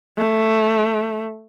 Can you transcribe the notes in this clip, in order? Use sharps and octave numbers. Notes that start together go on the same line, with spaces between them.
A3